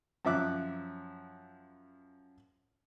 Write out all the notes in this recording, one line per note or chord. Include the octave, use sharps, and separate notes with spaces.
F#2 F3 E5 D6 F#6